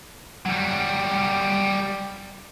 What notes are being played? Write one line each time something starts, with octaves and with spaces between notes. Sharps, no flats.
F#3 G3